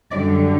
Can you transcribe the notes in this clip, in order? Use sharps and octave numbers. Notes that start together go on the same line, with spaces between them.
F#2 D3 G3 D5